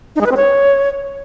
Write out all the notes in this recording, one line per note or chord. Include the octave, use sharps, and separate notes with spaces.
D#4
G#3
B4
C4
C#5